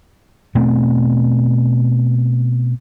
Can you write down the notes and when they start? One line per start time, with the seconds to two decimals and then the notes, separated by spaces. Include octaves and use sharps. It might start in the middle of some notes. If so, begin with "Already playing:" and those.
0.55 B2 A3 C4